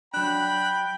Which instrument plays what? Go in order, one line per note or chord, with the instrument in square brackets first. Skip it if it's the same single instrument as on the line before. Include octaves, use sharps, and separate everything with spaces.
[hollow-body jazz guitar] F#3 D4 [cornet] G5 [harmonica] B5 [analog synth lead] F#6